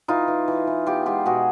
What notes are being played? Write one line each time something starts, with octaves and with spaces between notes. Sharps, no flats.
E3 D#4 F4
E3
E3
E3
B3 F4 G4
G#3 F4 G4
B2 F#4 G#4